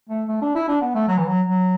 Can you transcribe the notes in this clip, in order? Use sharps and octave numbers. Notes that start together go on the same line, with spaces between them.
A3
A3
D4
E4
D4
B3
A3
F#3
E3
F#3
F#3